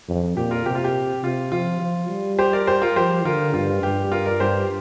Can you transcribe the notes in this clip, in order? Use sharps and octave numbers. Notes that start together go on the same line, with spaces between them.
F2
A#2 G4
F4 A#4
C3 G4
F4
G4
C3 F4
F3 F4
F3
G3
G4 C5
A#4 D5
G4 C5
F4 A#4
F3 G4 C5
D3 F4 A#4
G2 F4
G2 G4
F4 A#4
A#4 D5
G2 G4 C5